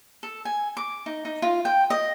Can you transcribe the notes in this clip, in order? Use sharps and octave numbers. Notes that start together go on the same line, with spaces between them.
A4
G#5
D6
D#4
D#4
F4
G5
D#5